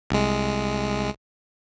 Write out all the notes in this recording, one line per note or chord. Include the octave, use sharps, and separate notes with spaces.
C2 G#3